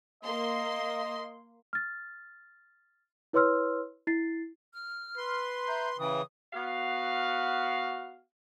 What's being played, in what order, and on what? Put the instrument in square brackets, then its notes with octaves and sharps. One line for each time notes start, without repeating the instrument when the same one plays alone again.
[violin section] A#3 C6 [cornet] D#5
[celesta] F6 A6
E4 B4 C#5 C6 E6 F6
E4 A6 C7
[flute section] F6
[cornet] B4 [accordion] C6
[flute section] E5 A#5 G6
[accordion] C#3 E3 [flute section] G5 D#6
[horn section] B3 F#4 F5